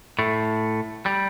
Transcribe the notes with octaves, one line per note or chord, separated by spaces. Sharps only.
A2 A3
G3